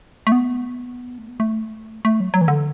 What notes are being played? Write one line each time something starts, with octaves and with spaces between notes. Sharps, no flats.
A3
B3
A3
B3
A3
A3
F#3
F#3
E3
D3